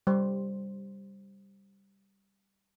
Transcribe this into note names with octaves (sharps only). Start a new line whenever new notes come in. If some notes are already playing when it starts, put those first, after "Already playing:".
G3 C5